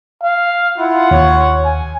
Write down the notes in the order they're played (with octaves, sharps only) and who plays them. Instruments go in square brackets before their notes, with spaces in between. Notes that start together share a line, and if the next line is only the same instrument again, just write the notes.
[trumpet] F5
[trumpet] E4 [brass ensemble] F4 F#5
[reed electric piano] D#2 [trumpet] C#5
[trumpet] G#5